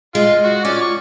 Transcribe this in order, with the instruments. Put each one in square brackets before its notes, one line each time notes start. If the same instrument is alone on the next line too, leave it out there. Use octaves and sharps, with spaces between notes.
[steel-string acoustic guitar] G#3 [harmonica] F4
[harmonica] F#4
[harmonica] C#4 D5 [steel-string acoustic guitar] F4
[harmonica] C#6